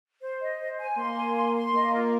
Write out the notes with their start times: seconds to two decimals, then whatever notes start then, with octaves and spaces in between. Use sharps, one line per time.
0.22 C5
0.41 D#5
0.60 C5
0.79 G#5
0.98 A#3 C6
1.17 G#5
1.36 C6
1.56 C6
1.74 A#3 D#5
1.93 F4